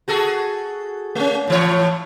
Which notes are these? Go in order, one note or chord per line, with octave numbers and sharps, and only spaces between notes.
F#4 G#4 A4
A3 C#4
A2 E3 C#5